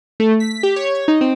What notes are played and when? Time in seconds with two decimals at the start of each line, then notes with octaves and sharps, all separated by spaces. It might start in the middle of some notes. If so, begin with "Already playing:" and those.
0.20 A3
0.40 B6
0.63 G4
0.76 C#5
0.95 C#5
1.08 D#4
1.21 C4